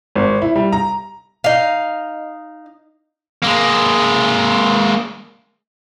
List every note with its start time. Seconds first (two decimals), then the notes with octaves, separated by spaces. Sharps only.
0.16 G#1
0.42 E4
0.56 G3
0.73 A#5
1.44 D#4 F5
3.42 G#3 A#3